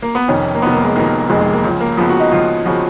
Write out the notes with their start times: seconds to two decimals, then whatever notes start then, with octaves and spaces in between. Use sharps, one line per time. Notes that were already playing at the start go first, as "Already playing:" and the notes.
0.02 A#3
0.15 B3
0.28 F1 F2 D#3 C#4
0.55 A#3
0.62 F1 F2 D#3 B3
0.73 A#3
0.84 G#3
0.96 F1 F2 D#3 A#3
1.30 F1 F2 D#3 G#3
1.41 G#3
1.53 A#3
1.64 C#2 C#3 F3
1.81 A#3
1.97 C#2 C#3 F3 B3
2.09 F#4
2.20 D#4
2.31 C#2 C#3 F3 F4
2.66 C#3 F3 F#4